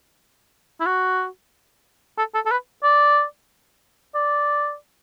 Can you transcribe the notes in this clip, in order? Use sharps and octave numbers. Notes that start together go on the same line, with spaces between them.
E4
F#4
A4
A4
A4
B4
D5
D5